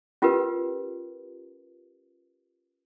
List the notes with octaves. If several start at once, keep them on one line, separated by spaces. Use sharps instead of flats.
C#4 F4 G4 A#4 B4